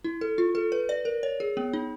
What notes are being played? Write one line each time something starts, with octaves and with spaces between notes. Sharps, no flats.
E4
A4
F4
A4
B4
D5
A#4
C#5
G#4
B3
D#4